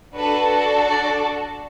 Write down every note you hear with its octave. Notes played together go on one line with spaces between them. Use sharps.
D4 F#4 A4 B4
D5